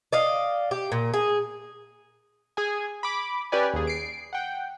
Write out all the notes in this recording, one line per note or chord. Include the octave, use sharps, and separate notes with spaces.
D5 D#5 F5
G4
A#2
G#4
G#4 G#5
B5 D6
C#4 G4 B4 D5 G#5
D#2 G#4
C7 D7
F#5 G5